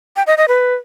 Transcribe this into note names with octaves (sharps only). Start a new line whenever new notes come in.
G5
D#5
D#5
B4